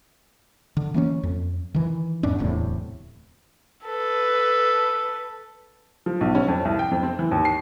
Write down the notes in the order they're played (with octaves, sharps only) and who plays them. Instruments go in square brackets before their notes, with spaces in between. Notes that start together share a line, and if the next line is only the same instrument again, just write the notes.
[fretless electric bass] D3
E3 A#3 C4 C#4
F2
D#3 E3
E2 G#2 C#4 D4
D1 E2 A2 C3
[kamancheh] A4 B4
[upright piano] F3
B1
C#4
F2
C2
G5
F2
C4
E3
D#2
C7